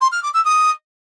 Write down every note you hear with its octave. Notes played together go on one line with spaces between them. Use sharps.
C6
F6
D6
E6
D#6